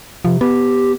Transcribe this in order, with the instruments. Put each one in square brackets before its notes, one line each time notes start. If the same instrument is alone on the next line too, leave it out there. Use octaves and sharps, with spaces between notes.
[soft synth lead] C3 [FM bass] F3
[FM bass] B3 [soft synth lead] G4